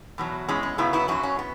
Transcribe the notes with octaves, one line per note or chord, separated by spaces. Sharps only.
E2 B2 F#3
E2 E3 G#3 C#4
C#4
F#2 C#3 F#3 B3 E4
B3 E4
F#2 F#3 C#4 F#4
C#4
B3